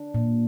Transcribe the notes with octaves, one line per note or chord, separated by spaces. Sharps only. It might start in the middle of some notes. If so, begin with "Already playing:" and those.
Already playing: D4
A#2